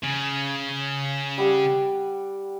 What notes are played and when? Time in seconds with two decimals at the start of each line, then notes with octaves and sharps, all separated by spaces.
0.03 C#3
1.38 G3 F#5